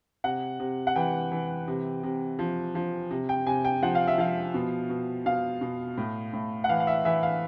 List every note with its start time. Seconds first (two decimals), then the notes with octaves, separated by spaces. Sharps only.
0.24 C3 F#5
0.60 C3
0.87 F#5
0.96 E3 G5
1.32 E3
1.68 C3
2.03 C3
2.39 F3
2.75 F3
3.11 C3
3.29 G5
3.47 C3 G#5
3.65 G5
3.83 F3 F#5
3.95 F5
4.08 E5
4.18 F3 F5
4.54 B2
4.90 B2
5.26 B2 F5
5.61 B2
5.98 A2
6.33 A2
6.64 F#5
6.69 E3 F5
6.80 F5
6.87 E5
7.05 E3 E5
7.23 F5